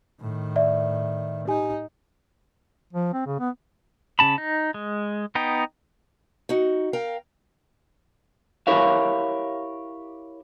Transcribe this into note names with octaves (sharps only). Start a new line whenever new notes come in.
A2 D#3
D5 E5
D#4 G4 G#5
F3
C4
C#3
B3
C#3 C#4 A5 B5
D#4
G#3
B3 D#4 G5
D#4 F#4
A#4 F5 G5
E4 G4 A#4 C#5 E5 F5